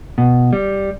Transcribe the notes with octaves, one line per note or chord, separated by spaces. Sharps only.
B2
G3